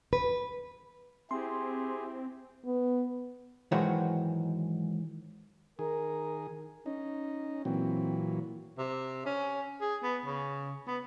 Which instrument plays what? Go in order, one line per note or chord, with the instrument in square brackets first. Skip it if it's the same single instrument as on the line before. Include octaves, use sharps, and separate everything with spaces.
[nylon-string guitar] B4
[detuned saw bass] C4 [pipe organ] E4 G4 G#4 [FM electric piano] C6
[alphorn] B3
[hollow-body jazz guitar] G#2 D#3 E3 F#3 G#3 F#4
[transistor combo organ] D#3 G#4 [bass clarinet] A#4
[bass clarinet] C#4 [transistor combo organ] D#4
[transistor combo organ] A#2 E3 F#3 [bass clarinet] C4
[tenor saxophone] C3
C#4
G#4
B3
C#3
B3